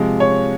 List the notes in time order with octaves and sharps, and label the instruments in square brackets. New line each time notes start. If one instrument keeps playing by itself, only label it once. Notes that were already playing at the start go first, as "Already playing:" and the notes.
Already playing: [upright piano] C3 F3 G#3
C#5